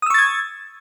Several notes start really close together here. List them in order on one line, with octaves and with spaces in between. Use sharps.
D#6 E6 C#6 A6 G#6